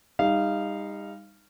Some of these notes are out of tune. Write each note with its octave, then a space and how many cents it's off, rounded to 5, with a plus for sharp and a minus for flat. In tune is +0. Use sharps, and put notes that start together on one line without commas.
G3 +40 D#4 +0 F5 -15